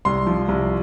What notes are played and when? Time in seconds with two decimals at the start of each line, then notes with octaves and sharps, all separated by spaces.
0.05 C2 C6
0.27 F3
0.48 C2